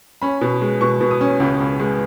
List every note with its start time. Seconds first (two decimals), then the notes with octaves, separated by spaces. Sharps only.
0.22 C#4 B5
0.41 B2
0.61 G#3
0.81 B2 C#6
1.01 B2
1.11 D#6
1.21 C#4
1.40 C#2
1.60 C#2
1.80 G#3